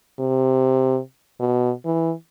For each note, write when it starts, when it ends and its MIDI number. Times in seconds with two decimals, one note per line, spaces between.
0.19 0.99 48
1.40 1.71 47
1.85 2.13 52